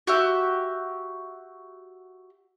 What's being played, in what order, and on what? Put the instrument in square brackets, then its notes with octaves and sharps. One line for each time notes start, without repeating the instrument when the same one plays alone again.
[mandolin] F#4 G4 E5